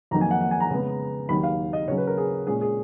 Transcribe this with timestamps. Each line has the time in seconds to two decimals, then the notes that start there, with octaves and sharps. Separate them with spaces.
0.11 F2 D#3 F#3 A#3 D#4 A#5
0.21 G#5
0.31 F#5
0.41 F#5
0.51 G#5
0.60 A#5
0.70 C#3 G#3 B3
1.29 D#2 D#3 F#3 B5
1.43 F5
1.73 D#5
1.88 C#3 F#3 C#4 C#5
1.97 B4
2.07 A#4
2.17 G#4
2.47 A#2 G#3 C#4 G#4
2.61 G#4